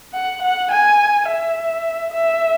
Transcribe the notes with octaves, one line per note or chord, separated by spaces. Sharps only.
F#5
F#5
G#5
E5
E5